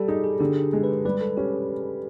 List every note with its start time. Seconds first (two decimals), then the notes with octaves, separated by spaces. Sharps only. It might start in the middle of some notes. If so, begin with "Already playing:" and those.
Already playing: G3 G4 A4
0.08 D#4 G#4
0.24 G#4
0.40 D3 G4
0.73 G#3
0.84 B4
1.05 G3 B4
1.21 A4
1.37 C#4 G4